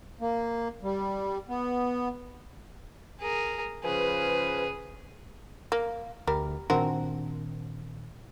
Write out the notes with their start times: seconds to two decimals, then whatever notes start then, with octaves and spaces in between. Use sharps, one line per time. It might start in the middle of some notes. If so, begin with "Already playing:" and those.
0.21 A#3
0.83 G3
1.49 B3
3.21 G#4 A#4
3.85 C#3 F3 G#4 B4
5.72 A#3
6.27 D2 G3 A#4
6.70 A#2 D#3 C4 D4 F#4 A#4